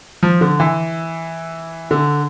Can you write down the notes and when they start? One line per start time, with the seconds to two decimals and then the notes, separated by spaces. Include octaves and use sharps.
0.23 F3
0.41 D3
0.60 E3
1.91 D3